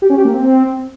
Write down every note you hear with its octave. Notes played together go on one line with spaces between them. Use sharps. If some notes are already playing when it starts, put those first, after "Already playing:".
G4
C#4
G4
A#3
C4